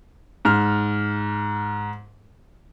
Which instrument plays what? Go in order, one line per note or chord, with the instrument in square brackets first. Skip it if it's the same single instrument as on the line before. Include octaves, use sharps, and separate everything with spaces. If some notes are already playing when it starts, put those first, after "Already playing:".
[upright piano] G#2 F6